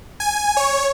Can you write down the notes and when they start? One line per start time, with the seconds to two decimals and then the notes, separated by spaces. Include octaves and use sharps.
0.20 G#5
0.57 C#5